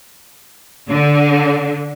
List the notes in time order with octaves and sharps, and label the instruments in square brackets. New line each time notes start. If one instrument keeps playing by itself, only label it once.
[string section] D3